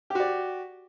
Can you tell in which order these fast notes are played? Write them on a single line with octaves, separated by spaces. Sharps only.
G4 F#4 D5